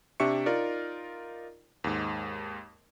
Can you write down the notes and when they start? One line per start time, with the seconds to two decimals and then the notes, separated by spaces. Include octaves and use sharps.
0.20 C3 D4 G4 E5 C#6 C#7
0.46 D#4 F4 A#4 D5
1.84 D#2 G#2